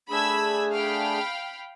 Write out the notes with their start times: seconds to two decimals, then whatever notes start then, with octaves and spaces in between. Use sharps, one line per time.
0.11 A3 D4 G#4 B5 E6 G#6
0.74 F5 G5 B5